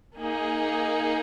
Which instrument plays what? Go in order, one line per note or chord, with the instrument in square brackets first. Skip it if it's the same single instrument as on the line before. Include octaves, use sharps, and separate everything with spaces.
[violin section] A#3 D#4 G#4